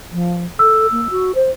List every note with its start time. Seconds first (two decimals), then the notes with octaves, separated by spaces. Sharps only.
0.12 F3
0.59 A4 E6
0.92 A#3
1.10 F#4
1.35 C5